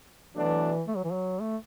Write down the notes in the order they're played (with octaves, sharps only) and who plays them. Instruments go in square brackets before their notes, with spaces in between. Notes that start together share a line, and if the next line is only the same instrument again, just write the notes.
[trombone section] B2 F#3 A3 D4 [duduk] E3
[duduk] A3
F#3
E3
F#3
A3